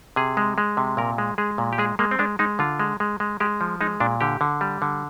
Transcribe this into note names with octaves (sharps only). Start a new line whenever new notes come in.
C3 G#4
G#3
G#3
C3
A#2 A#4
G#3
G#3 G#4
A#2
G4
G#3 G#4
G#3 A#3
C4
G#3 D4
G#3 D#4
D3 F4
G#3
G#3
G#3
G#3 G4
F3
G#3 D#4
A#2 D4
D3 G4
D3
G3
D3